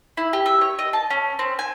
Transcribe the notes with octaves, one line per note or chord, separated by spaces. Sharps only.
E4
G4
E5
C#5
D#5
A5
C#4
C4
G#5